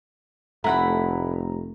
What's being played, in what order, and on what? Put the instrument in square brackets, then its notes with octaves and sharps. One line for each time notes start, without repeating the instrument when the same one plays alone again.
[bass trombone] F1 [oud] A3 [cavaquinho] E4 F#5 B5 [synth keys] A#5